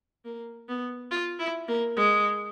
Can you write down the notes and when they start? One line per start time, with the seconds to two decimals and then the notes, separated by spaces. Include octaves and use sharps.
0.25 A#3
0.68 B3
1.11 F4
1.39 E4
1.68 A#3
1.97 G#3